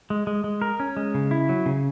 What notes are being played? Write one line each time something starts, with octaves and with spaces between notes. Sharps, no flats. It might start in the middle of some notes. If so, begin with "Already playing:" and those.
G#3
G#3
G#3
A#4
C#4
G#3
C#3
E4
F#3
C#3